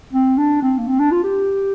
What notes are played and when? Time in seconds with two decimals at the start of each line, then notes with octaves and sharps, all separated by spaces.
0.13 C4
0.38 D4
0.62 C4
0.78 A#3
0.87 C4
0.99 D4
1.11 F4
1.24 G4